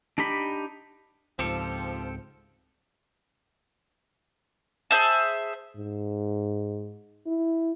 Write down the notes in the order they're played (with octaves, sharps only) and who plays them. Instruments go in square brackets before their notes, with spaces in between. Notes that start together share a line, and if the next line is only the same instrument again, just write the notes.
[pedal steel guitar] D4 D#4 G4 B5
[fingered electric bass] C#2 G#2 [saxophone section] F3 [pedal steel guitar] C4 G4 A4
[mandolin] G#4 C5 E5 A5
[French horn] G#2
E4